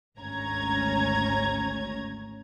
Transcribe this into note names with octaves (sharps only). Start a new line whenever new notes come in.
G#1 D2 C#4 A#5 G#6